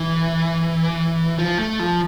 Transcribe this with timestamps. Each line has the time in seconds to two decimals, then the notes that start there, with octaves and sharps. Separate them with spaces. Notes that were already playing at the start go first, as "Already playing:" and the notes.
Already playing: E3
1.39 F3
1.59 A3
1.79 F3